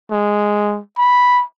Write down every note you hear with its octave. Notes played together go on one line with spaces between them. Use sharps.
G#3
B5